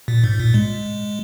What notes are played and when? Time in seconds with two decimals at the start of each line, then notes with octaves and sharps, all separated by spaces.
0.08 A#2
0.24 G#2
0.39 A#2
0.54 G#3